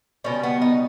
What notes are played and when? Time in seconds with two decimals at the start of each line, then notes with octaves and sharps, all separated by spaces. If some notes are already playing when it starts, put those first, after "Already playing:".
0.24 B2 G3 C#4
0.43 B3
0.62 D#4